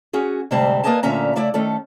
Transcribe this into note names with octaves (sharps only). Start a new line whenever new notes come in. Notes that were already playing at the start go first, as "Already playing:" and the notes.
C#4 F#4 G#4
D2 G#2 C3 G3 C4 A5
A#3 B4 D5 D#5 G#5 A5
D2 A#2 D3 C#4 E5 A#5
C#3 A3 E4 D5
D#3 A3 C#4 A4